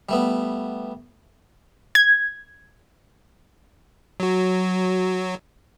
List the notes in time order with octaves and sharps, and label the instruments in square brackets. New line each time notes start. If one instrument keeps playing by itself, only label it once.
[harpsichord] G3 A3 B3
[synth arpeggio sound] G#6
[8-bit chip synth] F#3 F#4